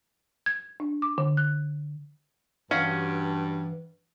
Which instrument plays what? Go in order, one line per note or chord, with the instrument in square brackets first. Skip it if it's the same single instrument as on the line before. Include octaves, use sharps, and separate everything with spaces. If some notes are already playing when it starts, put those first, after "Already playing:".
[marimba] G#6
D4
D6
D3
F#6
[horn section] G2 [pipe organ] E3 [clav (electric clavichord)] C#4 [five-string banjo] F#4 F5